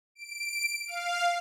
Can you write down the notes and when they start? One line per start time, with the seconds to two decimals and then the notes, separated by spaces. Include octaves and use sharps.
0.15 D7
0.87 F5